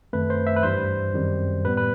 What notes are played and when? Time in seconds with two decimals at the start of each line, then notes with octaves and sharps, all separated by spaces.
0.13 F#2 D#3 A3 C4 B4
0.30 C5
0.47 E5
0.56 B4
0.63 G2 E3 G3 C5
1.14 F#2 D#3 G3 C4
1.65 A2 G3 B3 B4
1.77 B4